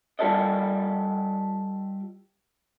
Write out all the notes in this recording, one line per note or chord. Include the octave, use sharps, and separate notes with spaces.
G3 F4 G4 A4 D5 D#5